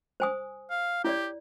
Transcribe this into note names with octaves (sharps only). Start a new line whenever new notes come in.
C5 G#5 D#6
F5
E4 G4 C#5 D5